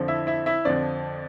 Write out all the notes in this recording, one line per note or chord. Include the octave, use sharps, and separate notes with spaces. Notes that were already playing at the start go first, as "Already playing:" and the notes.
Already playing: F2 D3 F3
E4 E5
E4 E5
E4 E5
F2 D3 F3 D4 D5